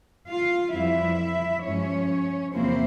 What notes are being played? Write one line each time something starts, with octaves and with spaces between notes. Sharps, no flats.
F4 F5
F2 E3 G3 C4 E4 E5
G2 F3 G#3 C#4 C#5
E2 C3 F3 A#3 C4 E4 C5